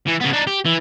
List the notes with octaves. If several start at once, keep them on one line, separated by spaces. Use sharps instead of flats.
E3
C#3 B3
D4 D#4
G4
E3